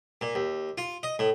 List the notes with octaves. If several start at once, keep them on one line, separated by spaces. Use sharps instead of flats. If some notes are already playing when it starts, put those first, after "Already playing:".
A#2
D#2
F4
D#5
A2